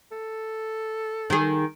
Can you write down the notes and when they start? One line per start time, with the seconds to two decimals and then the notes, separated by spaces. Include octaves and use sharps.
0.12 A4
1.30 D#3 G#4